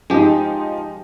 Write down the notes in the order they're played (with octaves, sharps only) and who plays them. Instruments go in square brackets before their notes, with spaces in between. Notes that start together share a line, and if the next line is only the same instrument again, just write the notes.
[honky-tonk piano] F3 D#4 [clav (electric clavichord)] G#3 G4